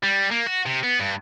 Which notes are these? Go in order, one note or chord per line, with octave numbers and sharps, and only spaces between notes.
G3
A#3
F#4
C3
B3
G2